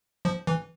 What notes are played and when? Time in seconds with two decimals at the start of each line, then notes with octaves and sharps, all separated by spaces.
0.25 F3
0.47 E3